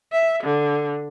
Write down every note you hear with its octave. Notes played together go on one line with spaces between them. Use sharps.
E5
D3